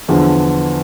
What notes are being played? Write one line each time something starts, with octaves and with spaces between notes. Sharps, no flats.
E2 D3 F3